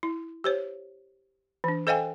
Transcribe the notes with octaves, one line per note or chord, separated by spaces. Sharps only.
E4
G4 C5 C#5
E3 D4
A4 C5 D#5 F5 G5 G#5